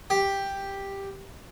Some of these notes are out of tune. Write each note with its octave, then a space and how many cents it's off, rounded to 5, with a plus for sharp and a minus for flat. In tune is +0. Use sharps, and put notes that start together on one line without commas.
G4 +5